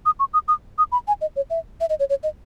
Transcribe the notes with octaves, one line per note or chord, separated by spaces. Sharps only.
D#6
C#6
D#6
D#6
D#6
B5
G#5
D#5
C#5
E5
E5
D#5
C#5
C#5
D#5